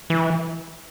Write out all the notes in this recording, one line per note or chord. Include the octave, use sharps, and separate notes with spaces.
E3